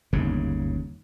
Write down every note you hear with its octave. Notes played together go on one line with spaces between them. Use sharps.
G1 D#2 G#2 C#3